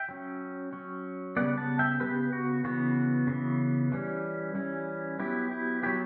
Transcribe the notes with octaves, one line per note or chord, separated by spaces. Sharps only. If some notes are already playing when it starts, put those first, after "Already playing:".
Already playing: E5 G5
F#3 C#4
F#3 C#4
C#3 G3 B3 D5 F#5
F#5 A5
E5 G5
C#3 G3 B3 G4 B4
F#4
C#3 E3 B3 F#4
C#3 E3 B3
E3 G3 C#4
E3 G3 C#4
F#3 B3 E4 G4
E4 G4
F#3 B3 E4 G4